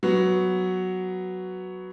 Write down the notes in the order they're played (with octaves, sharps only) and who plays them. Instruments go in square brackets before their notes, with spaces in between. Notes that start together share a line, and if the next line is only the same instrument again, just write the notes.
[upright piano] F#3 B3